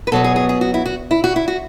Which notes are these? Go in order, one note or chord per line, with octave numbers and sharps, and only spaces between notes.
B4
B2 F#3 B3 A4
G#4
G#4
G#4
F#4
E4
F#4
E4
F#4
E4
F#4